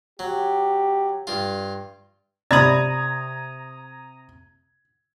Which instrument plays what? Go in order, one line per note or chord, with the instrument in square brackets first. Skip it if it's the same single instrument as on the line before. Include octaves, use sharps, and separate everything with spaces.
[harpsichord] F#3 [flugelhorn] G4
[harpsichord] G2 F4
[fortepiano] C3 [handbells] D5 B5 [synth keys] A#5 D#6 [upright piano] G#6